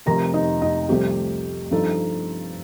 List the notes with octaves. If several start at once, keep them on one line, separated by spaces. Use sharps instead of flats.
F1 F2 C3 A#4 A#5
D#4 D#5
D#4 D#5
C2 C3 F3 A3 C4 G4
G2 F3 C4 D#4 A4